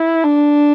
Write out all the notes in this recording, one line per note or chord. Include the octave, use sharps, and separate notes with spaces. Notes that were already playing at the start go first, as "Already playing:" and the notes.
Already playing: E4
D4